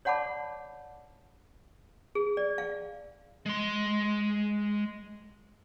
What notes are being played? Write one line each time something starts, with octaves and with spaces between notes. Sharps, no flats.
C#5 D5 F#5 A5 B5 D6
G#4
D5
F5
G#3 C6